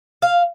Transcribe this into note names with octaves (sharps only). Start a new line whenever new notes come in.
F5